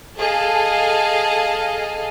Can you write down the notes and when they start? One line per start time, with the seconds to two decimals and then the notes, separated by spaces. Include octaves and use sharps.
0.17 G#4 A4 D#5 F5 A5